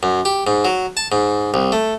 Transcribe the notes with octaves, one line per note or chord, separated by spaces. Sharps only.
F#2
G4
G#2
F#3
A5
G#2
C2
A3